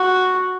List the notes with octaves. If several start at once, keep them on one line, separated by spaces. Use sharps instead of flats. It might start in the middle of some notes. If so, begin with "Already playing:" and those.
Already playing: F#4